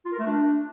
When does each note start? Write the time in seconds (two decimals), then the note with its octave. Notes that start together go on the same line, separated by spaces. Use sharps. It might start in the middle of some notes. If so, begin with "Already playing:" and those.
0.05 F4
0.12 A#4
0.19 A3
0.25 D4